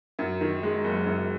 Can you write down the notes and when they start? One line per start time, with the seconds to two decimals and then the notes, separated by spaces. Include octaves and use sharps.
0.19 F#2
0.41 D#3
0.63 G#3
0.84 F#1
1.06 F#2